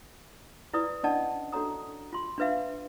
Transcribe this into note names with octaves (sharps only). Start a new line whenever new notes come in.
E4 F4 B4 D5 D#6
C#4 D4 D5 D#5 F#5 A5
D4 F#4 A4 C#5 A#5 D#6
F4 C6
D4 F4 B4 E5 F5